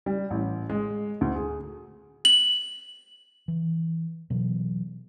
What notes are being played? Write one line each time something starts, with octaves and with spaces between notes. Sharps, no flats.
G3
A1
G#3
D2
G#4
F#7
E3
B2 E3 F#3